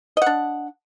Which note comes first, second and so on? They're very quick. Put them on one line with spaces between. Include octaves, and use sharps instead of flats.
D#5 F#5 D4